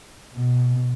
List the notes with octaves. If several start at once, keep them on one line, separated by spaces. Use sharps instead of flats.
B2